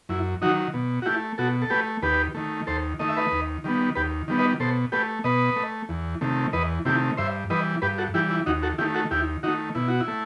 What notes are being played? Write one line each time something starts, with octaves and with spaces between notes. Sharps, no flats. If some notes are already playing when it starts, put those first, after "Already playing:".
F#2 E4
D#3 F#3 D#4 F#4
B2
F#4
A3 E4 G4
B2 F#4 A4
A4
A3 G4 B4
D#2 G4 B4
D#3 A3
D#2 A4 C5
D#3 A3 D#5
E5
B4 D#5
D#2
D#3 G3 B3
D#2 G4 B4
D#3 G3 B3
B4 D#5
B2 A4 C5
A3 G4 B4
B2 B4 D#5
A3
E2
C3 D#3 A3
E2 B4 D#5
C3 D#3 A3 E4 G4
G2 C5 E5
E3 G3 B4 D#5
G2 G4 B4
F#4 A4
E3 G3 E4 G4
E4
D#2 D#4 F#4
F#4 A4
D#3 A3 E4 G4
F#4 A4
D#2 E4 G4
D#3 A3 D#4 F#4
B2 E4
F#4
E4
A3